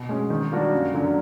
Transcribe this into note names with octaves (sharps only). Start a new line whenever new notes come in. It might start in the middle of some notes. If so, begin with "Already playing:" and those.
Already playing: B2
G#3 C#4
D#3
G3 A#3 D4 F#4
F#2
D3 F#3 A#3 C#4